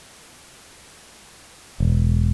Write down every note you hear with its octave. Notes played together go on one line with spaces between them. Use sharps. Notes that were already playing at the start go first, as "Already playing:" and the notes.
E1